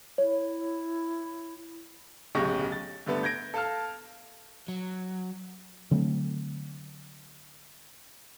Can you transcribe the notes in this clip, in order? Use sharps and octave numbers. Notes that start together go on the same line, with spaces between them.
E4 C#5
D1 B1 C#3 G4 C#6 A#6
A6
G2 D3 A3 B3
G6 G#6 A#6 D7
A4 F5 A5 F6
F#3
D3 F#3 A3 C4